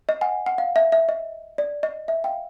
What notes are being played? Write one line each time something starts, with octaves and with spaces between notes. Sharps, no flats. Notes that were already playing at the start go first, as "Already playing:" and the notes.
D#5
F#5 G#5
F#5
F5
E5
E5
D#5
D5
D#5
E5
F5 G5